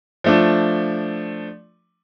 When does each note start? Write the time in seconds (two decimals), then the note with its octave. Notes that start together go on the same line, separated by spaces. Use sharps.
0.24 F3 A3 D4